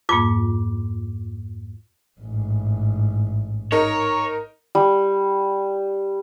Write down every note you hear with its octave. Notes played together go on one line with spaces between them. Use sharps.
F2 G#2 A#3 F4 D6
A1 G#2
D#4 A#4 C#5
G3